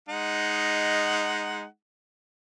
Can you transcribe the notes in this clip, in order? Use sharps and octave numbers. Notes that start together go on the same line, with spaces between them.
G#3 D#4 F#5